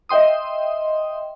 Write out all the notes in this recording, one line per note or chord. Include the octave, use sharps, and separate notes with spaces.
D#5 E5 G5 C6 D#6